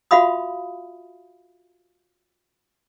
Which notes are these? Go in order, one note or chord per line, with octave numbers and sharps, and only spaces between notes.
F4 F#4 E5 F5 B5 D#6